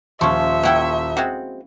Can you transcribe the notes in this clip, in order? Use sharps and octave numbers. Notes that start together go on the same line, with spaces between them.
D#1 F3 C#4 E5 C6 C#6
A#3 E4 A4 C#5 F#5 G5
G#3 C4 F#4